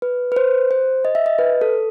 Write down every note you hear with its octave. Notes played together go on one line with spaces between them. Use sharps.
B4
B4
C5
C5
D#5
E5
D#5
B4
A4